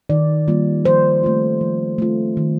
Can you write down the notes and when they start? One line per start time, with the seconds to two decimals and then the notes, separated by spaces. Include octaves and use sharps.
0.10 D#3 D5
0.48 G3 A#3 F4
0.85 F3 C5
1.23 A3 C4 F4
1.61 F3
1.98 A3 C4 F4
2.37 D#3